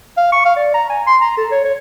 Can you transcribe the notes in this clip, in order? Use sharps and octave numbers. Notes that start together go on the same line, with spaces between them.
F5
C#6
F5
D5
A#5
G#5
C6
A#5
A4
C#5
C#5